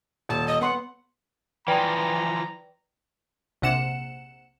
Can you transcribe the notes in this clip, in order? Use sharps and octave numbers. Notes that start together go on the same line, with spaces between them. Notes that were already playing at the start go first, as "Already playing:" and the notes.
D#1 A5
D#5
B3 F#5 C6
E3 F3 B4 D5 G5 A#5
A#1 C3 F#5 C#7 E7